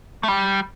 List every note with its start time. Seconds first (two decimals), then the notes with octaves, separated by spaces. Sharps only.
0.23 A3
0.28 G3